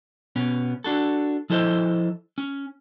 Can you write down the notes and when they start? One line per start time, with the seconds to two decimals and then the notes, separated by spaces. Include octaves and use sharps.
0.36 B2 B3 C#4
0.84 D4 F#4 A4
1.50 F3 E4 A4 C5 D#5
2.38 C#4